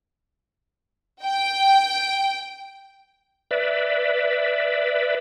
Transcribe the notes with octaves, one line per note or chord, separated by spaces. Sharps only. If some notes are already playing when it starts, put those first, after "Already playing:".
G5
B4 D5 E5